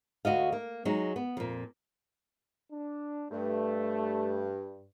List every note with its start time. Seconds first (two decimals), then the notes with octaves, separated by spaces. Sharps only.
0.25 D2 F#4 D#5 F5
0.52 A#3
0.85 F#3 G#3 D#4
1.16 B3
1.37 F2 A#2
2.72 D4
3.31 G2 A3